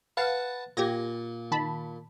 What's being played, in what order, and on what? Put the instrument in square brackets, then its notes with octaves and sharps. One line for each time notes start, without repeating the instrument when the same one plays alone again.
[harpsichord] B4 F#5 A5 [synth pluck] F5
[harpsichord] A#2 [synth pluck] G4 G#6 A#6
[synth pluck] D#3 A5 B5